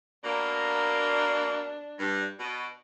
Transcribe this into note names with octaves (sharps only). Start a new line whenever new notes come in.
B2 A#3 D4
G2
B2